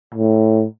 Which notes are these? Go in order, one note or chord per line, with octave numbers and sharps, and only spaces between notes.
A2